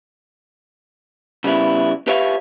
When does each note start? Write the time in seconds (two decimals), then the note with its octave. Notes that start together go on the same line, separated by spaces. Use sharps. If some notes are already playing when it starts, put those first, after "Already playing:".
1.44 C#3 G3 B3 E4
2.07 G4 B4 C#5 E5 F5